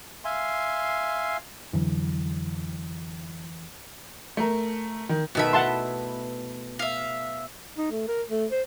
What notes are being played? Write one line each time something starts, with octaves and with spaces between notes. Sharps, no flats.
E5 F5 G#5 C6
F2 D3 E3 F#3
A3 A#4
D#3
B2 D#3 A3 B3 E5 B5
E4 F#5 A5 C6
E5 F5
D#4
A3
A#4
A3
C5